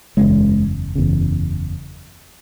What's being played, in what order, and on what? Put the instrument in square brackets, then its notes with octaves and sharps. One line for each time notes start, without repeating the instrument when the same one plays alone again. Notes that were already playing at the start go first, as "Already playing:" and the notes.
[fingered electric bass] F#1 E2 C#3 [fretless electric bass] G#3
[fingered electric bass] F#1 E2 C#3